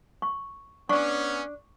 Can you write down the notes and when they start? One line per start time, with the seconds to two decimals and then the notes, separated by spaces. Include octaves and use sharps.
0.22 C#6
0.89 B3 C#4 D4 C#6